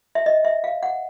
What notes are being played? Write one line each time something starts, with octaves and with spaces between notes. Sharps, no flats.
E5
D#5
E5
F5
F#5